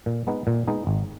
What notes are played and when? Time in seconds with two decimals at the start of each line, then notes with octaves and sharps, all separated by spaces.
0.06 A#2
0.27 G#3 B3 D#4
0.47 A#2
0.67 G#3 B3 D#4
0.87 G#1